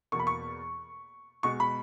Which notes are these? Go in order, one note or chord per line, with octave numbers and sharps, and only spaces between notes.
E2 B2 A#3 C#6
B5
C#6
B2 G#3 C#6
B5